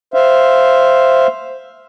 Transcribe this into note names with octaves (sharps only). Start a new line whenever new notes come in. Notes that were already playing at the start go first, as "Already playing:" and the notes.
C5 E5 F5